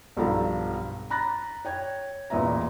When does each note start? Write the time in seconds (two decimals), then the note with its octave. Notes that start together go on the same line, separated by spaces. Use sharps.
0.17 B1 G2 F3 A4 A#5 B5
1.10 A#5 B5 F#6 A6 A#6
1.65 C#5 G5 G#6
2.30 A1 E2 A#2 B4 E5 A#5